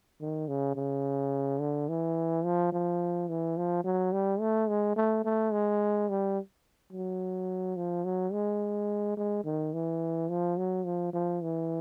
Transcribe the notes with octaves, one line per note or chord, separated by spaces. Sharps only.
D#3
C#3
C#3
D3
E3
F3
F3
E3
F3
F#3
G3
A3
G#3
A3
A3
G#3
G3
F#3
F3
F#3
G#3
G#3
D#3
E3
F3
F#3
F3
F3
E3